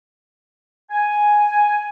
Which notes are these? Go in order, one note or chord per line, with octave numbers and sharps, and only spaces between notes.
G#5